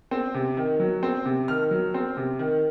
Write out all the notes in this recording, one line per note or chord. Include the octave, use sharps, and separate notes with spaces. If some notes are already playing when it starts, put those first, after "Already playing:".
C4
C3
D#3
F#3
C4
C3
D#3 F6
F#3
C4
C3
D#3